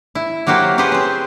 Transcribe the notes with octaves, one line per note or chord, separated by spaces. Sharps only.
E4
F#3 A#3 F#4 G4 C5
C#4 G4 G#4 B4 C5
C4 C5